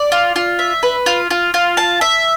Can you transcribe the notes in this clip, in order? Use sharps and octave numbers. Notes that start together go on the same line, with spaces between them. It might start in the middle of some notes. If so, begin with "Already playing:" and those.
Already playing: D5
F4
F4
E5
B4
F4
F4
F4
A5
E5